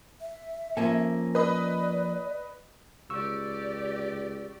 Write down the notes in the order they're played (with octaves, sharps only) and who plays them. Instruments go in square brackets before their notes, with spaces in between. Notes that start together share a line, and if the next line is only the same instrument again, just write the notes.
[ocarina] E5
[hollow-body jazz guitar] F3 C#4 A4 [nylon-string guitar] A#3 G#5 A5
[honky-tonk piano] B4 D#5 B5 [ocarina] D5
[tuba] C#2 [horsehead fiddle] G4 D5 [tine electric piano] C#6 E6